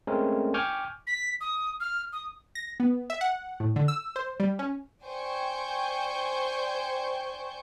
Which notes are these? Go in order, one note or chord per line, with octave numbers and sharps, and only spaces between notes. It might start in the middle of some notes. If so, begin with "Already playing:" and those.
G#3 A3 C4 C#4 A#4
G5 G#5 C#6 D6 F6 G6
B6
D#6
F6
D#6
A#6
B3
E5
F#5
A2
D3
E6
C5
G3
C#4
C5 D5 G5 G#5 C#6 G6